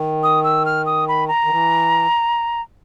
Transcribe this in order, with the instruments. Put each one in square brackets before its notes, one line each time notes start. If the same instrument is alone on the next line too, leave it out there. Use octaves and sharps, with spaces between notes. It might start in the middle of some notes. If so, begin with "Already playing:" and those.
Already playing: [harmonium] D#3
[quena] D#6
E6
F6
D#6
B5
A#5
[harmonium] D#3
E3